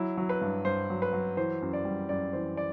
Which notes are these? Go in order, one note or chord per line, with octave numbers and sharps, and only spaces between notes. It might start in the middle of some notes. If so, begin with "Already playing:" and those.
Already playing: F#3 E4
F#3
B4
G2
G2 C5
F#3
B4
F#3
E3 C5
F#2
D5
G3
F#2 D5
E3 C5
D5